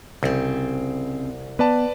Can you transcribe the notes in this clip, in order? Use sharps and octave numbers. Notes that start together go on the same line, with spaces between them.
C2 C#3 C4
B3 B4 D5 A5